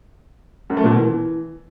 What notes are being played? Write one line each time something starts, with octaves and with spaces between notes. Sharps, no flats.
F#2
A3
A#2
B2
E3